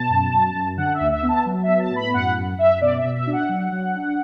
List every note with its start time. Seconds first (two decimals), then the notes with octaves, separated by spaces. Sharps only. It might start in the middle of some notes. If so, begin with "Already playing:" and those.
Already playing: B2 A5
0.09 F#2
0.32 F#2
0.55 F#2
0.77 D3 F#5
0.94 E5
1.00 D2
1.12 E5
1.23 B3
1.29 A5
1.45 F#3
1.63 B3 E5
1.79 A5
1.90 A2
1.96 B5
2.13 F#2 F#5
2.36 F#2
2.58 F#2 E5
2.81 B2 D5
2.98 E5
3.04 B2
3.15 E5
3.27 D4
3.33 F#5
3.49 F#3
3.72 F#3
3.95 D4